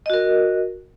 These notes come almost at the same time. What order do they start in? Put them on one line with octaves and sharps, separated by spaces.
D#5 F#4 A#4